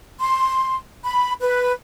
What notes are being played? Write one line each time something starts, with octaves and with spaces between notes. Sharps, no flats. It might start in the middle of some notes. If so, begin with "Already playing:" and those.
C6
B5
B4